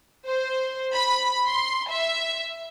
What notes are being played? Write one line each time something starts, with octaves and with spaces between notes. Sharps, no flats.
C5
B5
C6
E5